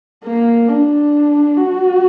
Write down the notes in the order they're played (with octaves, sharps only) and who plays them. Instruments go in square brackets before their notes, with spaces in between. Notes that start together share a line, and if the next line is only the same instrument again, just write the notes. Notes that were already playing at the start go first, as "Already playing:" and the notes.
[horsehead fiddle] A#3
D4
F#4